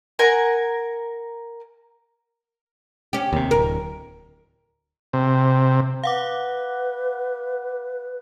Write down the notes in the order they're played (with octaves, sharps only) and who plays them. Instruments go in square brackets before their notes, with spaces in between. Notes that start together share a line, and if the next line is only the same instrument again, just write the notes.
[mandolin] A#4 F#5 G#5
[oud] C#4 G4
[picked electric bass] D#2 C3
[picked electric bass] D1 [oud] A#4
[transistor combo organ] C3
[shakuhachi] B4 [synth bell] F5 F#5 D6